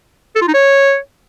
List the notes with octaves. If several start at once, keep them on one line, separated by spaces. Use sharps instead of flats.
A4
F4
D#4
C#5